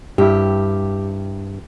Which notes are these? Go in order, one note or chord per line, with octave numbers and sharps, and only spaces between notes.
G2 E4 G4